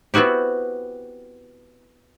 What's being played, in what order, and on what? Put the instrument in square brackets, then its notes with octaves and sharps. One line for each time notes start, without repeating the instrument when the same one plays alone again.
[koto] B3 C4 E4 F#4 G4